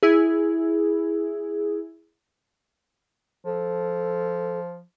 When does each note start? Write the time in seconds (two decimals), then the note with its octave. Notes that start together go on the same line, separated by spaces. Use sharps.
0.03 E4 G#4
3.45 F3 A4